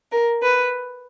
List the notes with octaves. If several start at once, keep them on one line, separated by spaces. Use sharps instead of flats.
A#4
B4